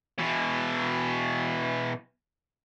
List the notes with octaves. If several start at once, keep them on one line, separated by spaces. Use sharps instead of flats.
B2 E3